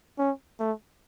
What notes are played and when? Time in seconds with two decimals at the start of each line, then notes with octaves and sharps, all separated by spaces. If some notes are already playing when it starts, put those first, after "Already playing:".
0.18 C#4
0.59 A3